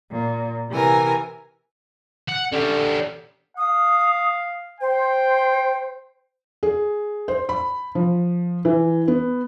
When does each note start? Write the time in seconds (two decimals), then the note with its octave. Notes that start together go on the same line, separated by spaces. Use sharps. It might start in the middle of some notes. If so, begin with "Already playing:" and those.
0.13 A#2
0.70 C3 E3 A#4 G#5
2.28 F#5
2.52 D3 C#4 G4
3.57 F5 D#6
4.80 C5 G5
6.63 G#4
7.28 C5
7.49 B5
7.95 F3
8.65 E3
9.08 B3